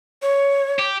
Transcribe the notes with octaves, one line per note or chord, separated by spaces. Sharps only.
C#5
G4